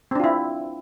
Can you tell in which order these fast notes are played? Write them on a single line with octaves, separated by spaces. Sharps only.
C4 D4 F4 E4